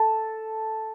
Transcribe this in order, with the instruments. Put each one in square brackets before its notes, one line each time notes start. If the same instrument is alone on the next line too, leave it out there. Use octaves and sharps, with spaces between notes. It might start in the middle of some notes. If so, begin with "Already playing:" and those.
Already playing: [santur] A4